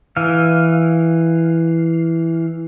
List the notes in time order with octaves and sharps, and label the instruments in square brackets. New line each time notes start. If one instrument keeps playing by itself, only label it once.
[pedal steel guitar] E3 F5